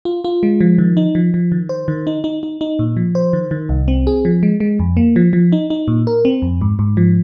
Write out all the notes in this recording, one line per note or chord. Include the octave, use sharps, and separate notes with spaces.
F4
F4
G#3
F3
D#3
D#4
F3
F3
D#3
C5
D#3
D#4
D#4
D#4
D#4
A#2
F3
C5
D#3
D#3
C2
C4
G#4
F3
G#3
G#3
F2
A#3
F3
F3
D#4
D#4
A#2
A#4
C4
F2
G#2
G#2
F3